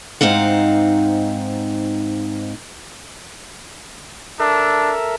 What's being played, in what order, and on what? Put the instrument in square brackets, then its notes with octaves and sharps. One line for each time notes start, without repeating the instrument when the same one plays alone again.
[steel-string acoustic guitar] G#2 C4 D#4 F5 F#5
[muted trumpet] D4 [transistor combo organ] A4 A#4 E5